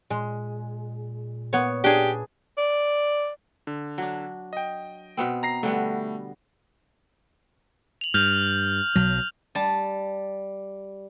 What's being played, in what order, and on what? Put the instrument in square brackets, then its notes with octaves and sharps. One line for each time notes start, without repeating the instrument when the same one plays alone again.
[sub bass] A#2 [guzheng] G#3
[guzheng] B3 C#5
[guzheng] D4 G#4 [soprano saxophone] G4
[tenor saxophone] D5
[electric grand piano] D3
[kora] F#3 D4
[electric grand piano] D#5 G5
[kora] B2 B3 C4
[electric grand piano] A#5 A#6 C7
[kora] D3 G3 B3 [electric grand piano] A3
[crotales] F7 F#7
[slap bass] G2 [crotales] F6 G6 F7
[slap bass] B1 F#3
[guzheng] G3 A5